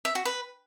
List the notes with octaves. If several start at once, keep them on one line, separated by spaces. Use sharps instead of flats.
E5
F#4
B4